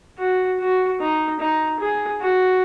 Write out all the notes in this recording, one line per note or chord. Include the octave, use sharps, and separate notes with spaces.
F#4
F#4
D#4
D#4
G#4
F#4